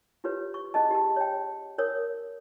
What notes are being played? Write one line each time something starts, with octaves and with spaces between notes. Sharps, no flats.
F4 G4 B4 C#5
C#6
C#4 G#4 D#5 A5
G4 A5
C#5 G5
A#4 C#5 D#6